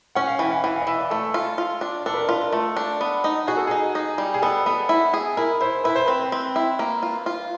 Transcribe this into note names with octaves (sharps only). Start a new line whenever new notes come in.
C#4 F#5
F5
E3 G5
F#5
E3 F#5
F5
D#5
E3 E5
D5
A3 A4
F4
F4
D4
D4 A4
B4
A#4
F4 B4
A#4
A3 A4
D4
B3
D#4
F#4 G#4
A4
D#4 G#4
D#4
G3
G#4
B3 A4
B3
E4
G#4
E4 A#4
E4 C5
E4 B4
C5
C4 B4
C4
E4
A#3
F4
F4